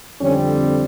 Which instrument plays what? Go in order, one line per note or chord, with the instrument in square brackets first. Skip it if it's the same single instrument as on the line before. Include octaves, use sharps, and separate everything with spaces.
[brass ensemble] F2 D3 G3 C4 C#4